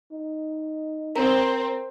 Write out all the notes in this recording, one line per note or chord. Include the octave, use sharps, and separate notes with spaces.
D#4
C4 A#4 A#5